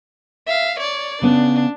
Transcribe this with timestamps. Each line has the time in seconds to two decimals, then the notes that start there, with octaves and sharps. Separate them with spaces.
0.46 E5 F5
0.79 C#5 D5
1.22 C#3 B3 D4